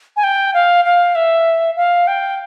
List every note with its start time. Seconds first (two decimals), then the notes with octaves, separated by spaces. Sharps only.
0.17 G#5
0.24 G5
0.54 F5
0.85 F5
1.15 E5
1.77 F5
2.07 G5